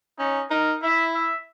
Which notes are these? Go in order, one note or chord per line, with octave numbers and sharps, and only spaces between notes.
C#4 D#4
D#4 A#4
E4 E5
E5